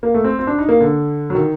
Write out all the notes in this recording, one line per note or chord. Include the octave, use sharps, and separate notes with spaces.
A#3
A3
C4
C4
D4
D#4
A#3
D3
F#3
D#3